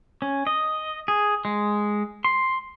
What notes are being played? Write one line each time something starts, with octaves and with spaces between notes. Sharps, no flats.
C#4
D#5
G#4
G#3
C6